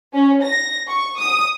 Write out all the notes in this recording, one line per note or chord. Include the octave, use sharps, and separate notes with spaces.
C#4
A#6
C#6
D#6